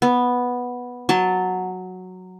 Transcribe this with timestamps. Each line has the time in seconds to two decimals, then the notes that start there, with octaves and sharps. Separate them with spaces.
0.02 B3
1.09 F#3 A5